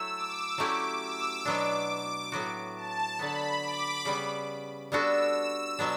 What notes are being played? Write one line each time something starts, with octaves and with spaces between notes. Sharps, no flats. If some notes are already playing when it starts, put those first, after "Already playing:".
Already playing: F#3 A3 E4 A4 E6
D6
F#3 A3 C#4 E4 G4 D6
E6
B2 F#3 B3 D4 D6
A2 F#3 B3 F#4
A5
D3 F#3 B3 B5
D6
C#3 G3 B3
G3 B3 D4 F#4 A4 E6
E6
B2 F#3 B3 D4